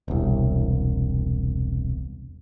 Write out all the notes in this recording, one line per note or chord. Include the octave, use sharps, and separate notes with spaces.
E1 C2